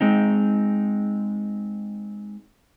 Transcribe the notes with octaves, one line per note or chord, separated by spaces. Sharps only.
G#3 C4 D#4